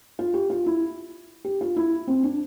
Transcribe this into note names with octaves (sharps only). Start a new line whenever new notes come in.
F4
G4
F4
E4
G4
F4
E4
C4
D4